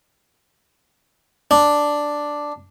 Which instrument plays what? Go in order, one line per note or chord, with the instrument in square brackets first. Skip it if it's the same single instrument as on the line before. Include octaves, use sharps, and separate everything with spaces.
[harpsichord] D4